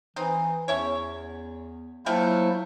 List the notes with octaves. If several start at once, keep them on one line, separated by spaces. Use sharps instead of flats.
E3 C4 D#4
E2 C#4 E4 C#5
F#3 A3 A#3 E4 F4 C5 G5